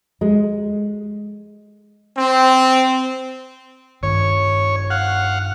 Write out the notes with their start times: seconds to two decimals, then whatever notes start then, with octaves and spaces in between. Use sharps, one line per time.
0.21 G#3
2.17 C4
4.03 G2 D#3 C#5
4.90 F5 F#5